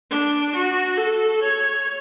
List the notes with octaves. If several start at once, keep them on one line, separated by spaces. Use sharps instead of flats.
D4
F#4
A4
C#5